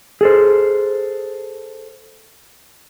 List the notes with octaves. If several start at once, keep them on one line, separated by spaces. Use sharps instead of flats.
G#4 A4 C5